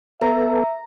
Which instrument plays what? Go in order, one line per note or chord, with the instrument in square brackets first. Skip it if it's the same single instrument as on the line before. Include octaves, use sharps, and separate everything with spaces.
[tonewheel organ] B3 A4 [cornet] E5 [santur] A#5